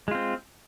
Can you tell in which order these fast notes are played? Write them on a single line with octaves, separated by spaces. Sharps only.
G#3 F4 C4